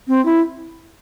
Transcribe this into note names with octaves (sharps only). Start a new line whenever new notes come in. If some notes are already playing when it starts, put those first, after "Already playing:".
C4
E4